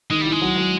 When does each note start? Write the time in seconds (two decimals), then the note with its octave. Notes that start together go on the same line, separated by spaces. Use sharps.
0.11 D#3 G#3
0.21 G3 E4
0.32 G#3
0.42 F#3
0.58 F#3